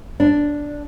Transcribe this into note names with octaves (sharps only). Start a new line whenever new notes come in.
D4